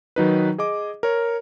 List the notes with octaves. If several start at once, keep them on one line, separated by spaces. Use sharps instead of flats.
D#3 F#3 D#4 B4
G#4 D#5 D6
A#4 C#5